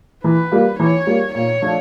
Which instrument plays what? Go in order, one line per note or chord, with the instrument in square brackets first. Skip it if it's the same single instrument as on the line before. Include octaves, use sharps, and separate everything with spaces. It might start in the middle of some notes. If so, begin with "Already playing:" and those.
[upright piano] E3 [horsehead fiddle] B4
[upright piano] G3 A#3
[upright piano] E3 [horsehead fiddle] C#5
[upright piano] G3 A#3
[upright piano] A#2 [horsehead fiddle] C#5
[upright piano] F3 A3 D4 F4